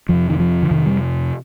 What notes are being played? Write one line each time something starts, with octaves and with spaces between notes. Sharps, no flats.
F2 C3 F3
D#3
F3
D3
F2 C3 D#3
G3